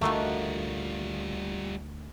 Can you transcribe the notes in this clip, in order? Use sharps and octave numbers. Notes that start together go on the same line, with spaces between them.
D2 G3 A3 A#3 D#4 F4 F#4